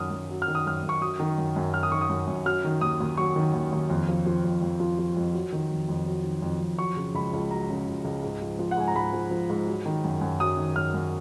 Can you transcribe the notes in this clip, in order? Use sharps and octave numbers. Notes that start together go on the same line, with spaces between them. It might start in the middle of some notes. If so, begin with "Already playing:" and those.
Already playing: F#2 D#3 F#3 D#6 F6
F#2
F#3
F6
D#3
D#6
F#2 F6
F#2
C#6
F#3 D#6
D#3
F#2
F#2
F#3 F6
D#6
D#3 C#6
D#6
F#2
F#2
F#3 F6
D#3
D#2 D#6
D#2
F#3 C#6
D#3
D#2
D#2
F2
F3
F3
F2
F2
F3
F3
F2
F#3
D#3
F2
F2
F#3
D#3
F2
F2
F#3 C#6
C#3
C#2 B5
C#2
F#3 A#5
C#3
C#2
C#2
G#2
F3
F3
F#5
G#2 G#5
A#5
G#2 B5
F3
F3
G#2
F#3
D#3
F#2
F#2
F#3 D#6
D#3
F#2 F6
F#2